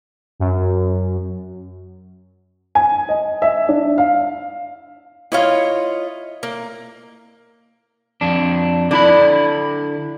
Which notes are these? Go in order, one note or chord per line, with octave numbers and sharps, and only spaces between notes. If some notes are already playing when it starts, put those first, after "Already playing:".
F#2
G#5
D#5
E5
D4
F5
E4 F4 C#5 D#5 F5
A#3
F2 D4
D3 D4 E4 B5